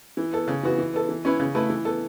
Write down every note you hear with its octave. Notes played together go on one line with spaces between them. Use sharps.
E3
B3 A4
C#3
E3 B3 F#4
E3
B3 A4
E3
C#4 E4 B4
C#3
A3 E4 B4
E3
B3 A4